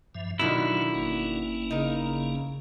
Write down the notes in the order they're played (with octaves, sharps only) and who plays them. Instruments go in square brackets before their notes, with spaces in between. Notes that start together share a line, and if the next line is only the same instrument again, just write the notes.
[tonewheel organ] G2 F3 E5
[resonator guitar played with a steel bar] B2 D3 D#3 [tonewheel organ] F#3 F4 [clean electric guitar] E4
[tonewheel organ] G1 A#3 C#4
[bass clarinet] C#3 [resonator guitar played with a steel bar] D#4 A#4